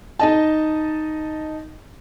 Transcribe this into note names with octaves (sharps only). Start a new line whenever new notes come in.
D#4 D#5 A5